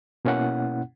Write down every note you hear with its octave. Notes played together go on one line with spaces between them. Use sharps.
B2 A#3 C#4 E4 F#5